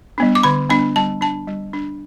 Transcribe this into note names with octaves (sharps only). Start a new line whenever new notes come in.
G3 B3 D4
D6
D3 B5
G3 B3 D4 B5
G3 A5
D4 A5
G3
D4